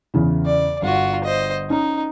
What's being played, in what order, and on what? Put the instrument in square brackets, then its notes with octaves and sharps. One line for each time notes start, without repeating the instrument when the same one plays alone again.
[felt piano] E2 C#3 E3
[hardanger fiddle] D5
[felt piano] G1 [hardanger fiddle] F4 F#4
[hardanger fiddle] C5 D#5
[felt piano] C#4 [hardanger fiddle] D#4